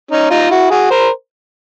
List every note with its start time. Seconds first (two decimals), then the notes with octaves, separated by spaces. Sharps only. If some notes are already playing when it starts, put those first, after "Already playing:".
0.11 C#4 D#4
0.31 D#4 F4
0.50 E4 F#4
0.70 F#4 G#4
0.90 A#4 C5